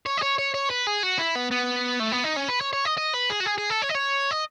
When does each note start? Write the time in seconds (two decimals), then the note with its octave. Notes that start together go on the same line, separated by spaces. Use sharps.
0.06 C#5
0.17 D#5
0.22 C#5
0.38 C#5
0.54 C#5
0.70 B4
0.87 G#4
1.03 F#4
1.19 E4
1.35 B3
1.51 B3
2.00 A3
2.12 B3
2.24 D#4
2.37 C#4
2.49 B4
2.61 C#5
2.73 C#5
2.85 D#5
2.97 D#5
3.13 B4
3.30 G#4
3.40 F#4
3.46 G#4
3.58 G#4
3.70 A4
3.82 C#5
3.89 D#5
3.95 C#5
4.31 D#5